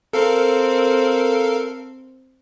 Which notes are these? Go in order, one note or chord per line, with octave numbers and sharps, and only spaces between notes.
C4 A4 A#4 F5